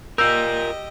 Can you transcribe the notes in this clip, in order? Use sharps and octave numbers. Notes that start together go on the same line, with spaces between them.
F4 G4 A#4 D#5 E6 G6